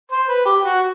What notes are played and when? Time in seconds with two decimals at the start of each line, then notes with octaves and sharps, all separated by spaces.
0.12 C5
0.29 B4
0.46 G4
0.63 F#4